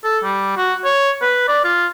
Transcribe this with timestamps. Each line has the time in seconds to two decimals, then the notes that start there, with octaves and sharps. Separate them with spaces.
0.04 A4
0.24 G3
0.57 F#4
0.85 C#5
1.22 B4
1.48 D5
1.64 F4